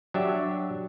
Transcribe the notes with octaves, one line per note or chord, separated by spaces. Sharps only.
F#3 D4 G4 E5